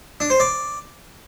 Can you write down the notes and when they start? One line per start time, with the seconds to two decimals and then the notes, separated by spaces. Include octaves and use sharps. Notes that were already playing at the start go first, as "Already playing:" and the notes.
0.20 D4
0.30 C5
0.40 D5